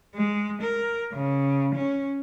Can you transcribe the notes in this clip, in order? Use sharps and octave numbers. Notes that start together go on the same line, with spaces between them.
G#3
A#4
C#3
C#4